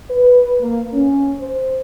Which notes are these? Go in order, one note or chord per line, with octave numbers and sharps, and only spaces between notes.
B4
A#3
C#4
C5